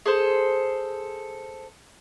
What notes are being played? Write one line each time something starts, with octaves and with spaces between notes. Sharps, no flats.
G#4 A4 C5